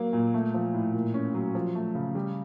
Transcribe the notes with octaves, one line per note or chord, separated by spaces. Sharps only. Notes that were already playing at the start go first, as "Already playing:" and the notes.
Already playing: F#3 A#3
A#2
A3
F3
A2
A#2
C#4
F#3
F3
A3
C#3
G3